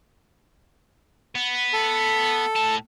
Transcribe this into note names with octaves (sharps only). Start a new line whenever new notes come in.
B3
A4
A2 A5